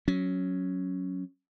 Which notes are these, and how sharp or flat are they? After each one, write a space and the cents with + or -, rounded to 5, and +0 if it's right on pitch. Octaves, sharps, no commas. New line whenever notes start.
F#3 +0 C#4 +0